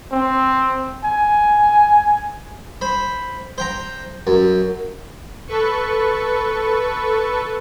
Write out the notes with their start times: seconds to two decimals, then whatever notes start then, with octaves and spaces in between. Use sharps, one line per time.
0.12 C4
1.04 G#5
2.81 C5 B5
3.58 C5 G5 A#5
4.27 F#2
5.47 A4 B4 C#6